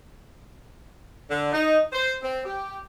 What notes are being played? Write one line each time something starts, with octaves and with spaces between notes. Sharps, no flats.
D3
D#4
C5
C4
G4